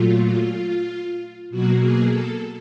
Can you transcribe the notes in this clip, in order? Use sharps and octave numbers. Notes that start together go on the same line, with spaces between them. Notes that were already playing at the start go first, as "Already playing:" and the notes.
Already playing: A#2 F#3 A3 F4
B2 F#3 A#3 F#4
G#4
A4